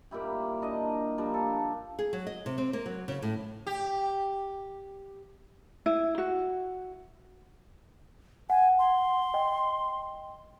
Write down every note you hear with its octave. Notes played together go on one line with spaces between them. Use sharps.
A#2 G3 E4 G4
D4 A#4 D#5
F3 G3 A#3 D4
A4
G#4
F#3
D#5
C3
C4
A#3
F#3
C#3
A2
G4
E4
F#4
F#5 G#5
C6
D#5 G5